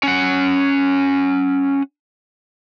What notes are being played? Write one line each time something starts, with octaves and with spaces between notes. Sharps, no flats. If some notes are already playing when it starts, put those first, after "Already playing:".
C#4 F#5